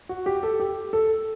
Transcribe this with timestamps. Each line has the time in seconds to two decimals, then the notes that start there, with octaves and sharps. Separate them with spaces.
0.09 F#4
0.26 G4
0.43 A4
0.60 G4
0.93 A4